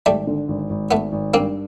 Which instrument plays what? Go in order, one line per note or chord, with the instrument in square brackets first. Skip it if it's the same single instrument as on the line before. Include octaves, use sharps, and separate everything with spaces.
[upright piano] G#1 [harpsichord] G3 A3
[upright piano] D3
G#1
G#1
[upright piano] G#1 [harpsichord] A3 B3
[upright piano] G#1
[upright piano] G2 [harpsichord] A#3 C4